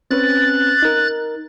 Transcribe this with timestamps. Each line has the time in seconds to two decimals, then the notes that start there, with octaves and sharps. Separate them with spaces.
0.11 C4 C#4 B4 F#6 A6
0.82 D#4 A#4